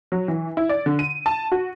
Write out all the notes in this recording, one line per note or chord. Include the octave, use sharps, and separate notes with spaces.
F#3
E3
E4
D5
D3
D#7
A5
F#4